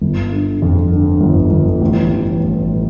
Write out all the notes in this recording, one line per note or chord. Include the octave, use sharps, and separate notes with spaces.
G1
D3
F2
D3
G1
G1
A1
A1
A1
A2